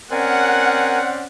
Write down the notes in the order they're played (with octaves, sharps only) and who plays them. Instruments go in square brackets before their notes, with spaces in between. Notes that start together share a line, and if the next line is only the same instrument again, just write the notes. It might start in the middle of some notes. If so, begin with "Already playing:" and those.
[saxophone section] C4 C#4 D5 [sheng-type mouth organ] A#4 G#5 [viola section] F#5